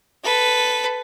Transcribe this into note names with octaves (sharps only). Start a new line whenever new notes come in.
A4 B4